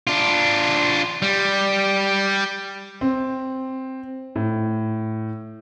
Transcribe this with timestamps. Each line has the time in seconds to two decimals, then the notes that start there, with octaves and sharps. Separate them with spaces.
0.07 D4 F4
1.22 G3
3.01 C4
4.36 A2